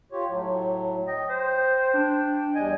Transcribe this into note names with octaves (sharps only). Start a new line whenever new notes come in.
F4 G4 C#5
A2 F#3
D#5 G5
C5
D4
E2 G3 D#5 G#5